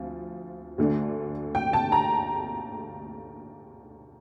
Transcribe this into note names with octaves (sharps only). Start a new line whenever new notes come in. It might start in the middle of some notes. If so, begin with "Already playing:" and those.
Already playing: D2 F3 C4
D2 D3 A3 D4
G5
A5
A#5